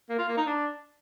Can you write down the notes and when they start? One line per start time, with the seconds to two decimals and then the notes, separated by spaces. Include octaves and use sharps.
0.09 A#3
0.19 F4
0.28 A#3
0.37 D#4
0.47 D4